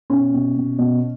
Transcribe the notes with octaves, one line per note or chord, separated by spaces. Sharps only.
B2 C#4
B2
B2
B2